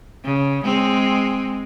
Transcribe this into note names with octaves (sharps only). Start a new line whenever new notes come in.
C#3
G#3 C4